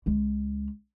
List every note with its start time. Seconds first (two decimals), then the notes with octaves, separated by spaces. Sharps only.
0.06 C#2 G#3